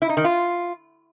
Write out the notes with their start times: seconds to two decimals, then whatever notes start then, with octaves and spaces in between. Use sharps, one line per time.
0.02 E4
0.09 D#4
0.17 D#3
0.24 F4